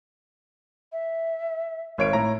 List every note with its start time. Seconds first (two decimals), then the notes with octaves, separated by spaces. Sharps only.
0.92 E5
1.98 G#1 A#4 C#5 D7
2.13 A2 C#5 A#5